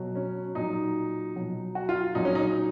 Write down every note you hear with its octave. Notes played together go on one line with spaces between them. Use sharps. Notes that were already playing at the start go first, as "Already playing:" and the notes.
Already playing: B2 F#3
C#4
A#2 F#3 D#4
B2 F#3
F#4
F4
A#2 F#3 D#4
C#4
D#4